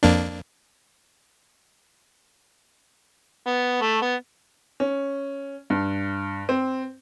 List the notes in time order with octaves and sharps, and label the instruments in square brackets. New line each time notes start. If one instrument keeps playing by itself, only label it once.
[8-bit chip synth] F2 A#3 D4
[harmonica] B3
A3
B3
[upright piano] C#4
G2
C4